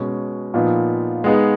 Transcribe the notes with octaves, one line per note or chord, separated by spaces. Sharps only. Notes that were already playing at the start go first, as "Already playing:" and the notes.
Already playing: B2 G#3 C#4
A#2 F3 B3 D#4
G#3 B3 D#4 G#4